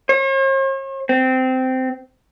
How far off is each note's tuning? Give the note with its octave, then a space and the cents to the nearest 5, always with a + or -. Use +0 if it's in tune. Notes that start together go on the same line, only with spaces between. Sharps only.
C#5 -45
C4 -15